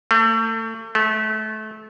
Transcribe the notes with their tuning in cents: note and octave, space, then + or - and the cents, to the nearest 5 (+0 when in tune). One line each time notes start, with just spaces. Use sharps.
A3 +35
A3 -25